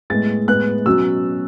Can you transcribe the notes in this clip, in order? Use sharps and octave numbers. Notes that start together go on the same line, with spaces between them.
A2 G#3 B3 A6
A2 G#3 B3 F#6
B2 F#3 C#4 E6